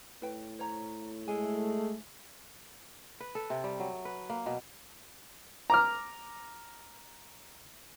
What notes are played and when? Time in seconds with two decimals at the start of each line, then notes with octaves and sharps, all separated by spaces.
0.22 A2 B4 G5
0.59 C5 C#5 A#5
1.28 G#3 A3 E4 G#5
3.20 B4
3.35 A4
3.50 C3
3.64 G3
3.80 F#3
4.05 B4
4.30 A#3
4.46 B2
5.70 A#5 D6 F6